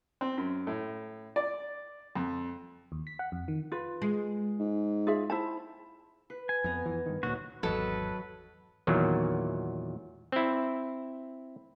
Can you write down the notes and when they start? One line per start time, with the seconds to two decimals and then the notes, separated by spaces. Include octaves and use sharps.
0.21 C4
0.37 F#2
0.67 A2
1.36 D5
2.15 F2
2.92 D#2
3.07 B6
3.19 F#5
3.32 F2
3.48 D#3
3.72 F4 B4
4.02 G#3
4.59 G#2
5.07 F4 G#4 E5
5.30 E4 C5 A5
6.30 B4
6.49 G#5
6.64 F2 B3 A#5
6.86 F2 E3
7.06 G2 D#3
7.23 D1 A#2 F#3 D#4 F#4 C#5
7.63 G#1 E2 F#3 A4 B4 D#5
8.87 E2 A#2 D#3 F#3
10.32 C4 E4